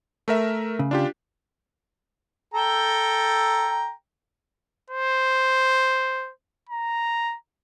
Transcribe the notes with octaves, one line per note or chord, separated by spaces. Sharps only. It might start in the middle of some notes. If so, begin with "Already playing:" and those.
A3 A#4 E5
C#3
D4 F4 G4
A4 G5 A#5
C5
A#5